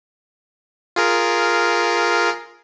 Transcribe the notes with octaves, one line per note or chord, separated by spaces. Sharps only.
F4 G#4 A#4